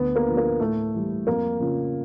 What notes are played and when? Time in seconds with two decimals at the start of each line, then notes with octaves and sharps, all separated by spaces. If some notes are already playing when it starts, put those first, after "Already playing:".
Already playing: D2 B3
0.16 A#3
0.26 D3 F3
0.37 A#3
0.59 A2 A3
0.94 E3 G3
1.27 F2 A#3
1.60 C#3 F3